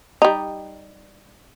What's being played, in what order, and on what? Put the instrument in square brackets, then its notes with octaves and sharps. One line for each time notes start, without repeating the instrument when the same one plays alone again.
[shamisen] G3 D#4